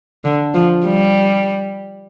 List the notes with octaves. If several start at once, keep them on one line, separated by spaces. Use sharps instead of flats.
D3
F3
G3